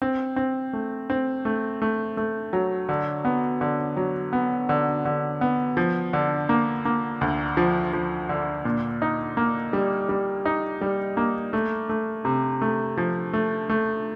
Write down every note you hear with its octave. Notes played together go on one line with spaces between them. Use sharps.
C4
C4
A3
C4
A3
A3
A3
F#3
D3
B3
D3
F#3
B3
D3
D3
B3
F3
D3
A#3
A#3
D2
F3
F3
D3
A#2
D#4
A#3
G3
G3
D#4
G3
A#3
A3
A3
C3
A3
F3
A3
A3